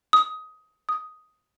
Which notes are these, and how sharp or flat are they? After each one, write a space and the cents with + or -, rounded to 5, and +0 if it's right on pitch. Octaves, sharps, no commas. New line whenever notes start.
D#6 +15
D#6 +5